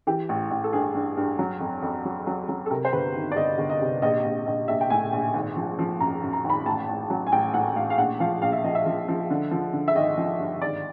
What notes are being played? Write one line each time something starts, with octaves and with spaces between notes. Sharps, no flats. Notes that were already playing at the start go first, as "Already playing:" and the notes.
E3 G4
A1
A1
A4
G2 G#4
G2
G2
F#3
F2
F2
F#3
F#3
F#3
A4
C3 A#4
C5
G1 B4
D#3
D5
G1 D#5
G1
D#5
C3
A#1 D#5
A#1
A#1 D#5
A#1 E5
G5
A2 G#5
A#1
G#1
F3
F3
F#2 A#5
F#2
A#5
G#1
B5
A1 A5
A1
F#3
G#5
A1 G5
A2 F#5
A1 F5
F5
A#1 F#5
F3 F5
A#1 F5
E5
F3 D#5
E5
F3
F3
D3
F3
D3
E5
G#1 D#5
F3
G2
G#1 D5